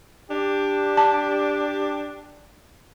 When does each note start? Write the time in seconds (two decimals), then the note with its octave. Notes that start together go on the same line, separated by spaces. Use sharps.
0.31 D4 G4
0.97 A5